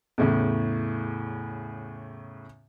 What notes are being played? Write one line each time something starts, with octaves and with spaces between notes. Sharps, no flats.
E2 A2 C#3